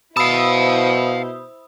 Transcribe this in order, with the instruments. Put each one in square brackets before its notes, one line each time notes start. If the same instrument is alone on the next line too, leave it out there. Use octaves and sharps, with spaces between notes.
[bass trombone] B2 [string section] E4 C5 [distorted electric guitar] F5 A5 [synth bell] B5 D#6 E6